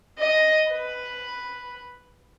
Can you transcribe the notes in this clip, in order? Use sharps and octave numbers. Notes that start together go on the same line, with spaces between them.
D#5
B4